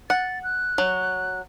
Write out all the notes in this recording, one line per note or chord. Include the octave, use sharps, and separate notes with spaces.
F#5 A6
F#6
F#3